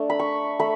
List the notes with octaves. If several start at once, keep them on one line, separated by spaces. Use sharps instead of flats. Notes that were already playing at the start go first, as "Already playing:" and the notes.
Already playing: A3 D4
B5
C#6
A3 B5